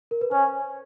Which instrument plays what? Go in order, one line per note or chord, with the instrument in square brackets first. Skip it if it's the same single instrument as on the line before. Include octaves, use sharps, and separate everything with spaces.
[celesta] A#4
B4
[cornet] C#4 [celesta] C5